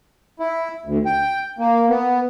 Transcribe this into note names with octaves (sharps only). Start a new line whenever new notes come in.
E4
D2
G5
A#3
B3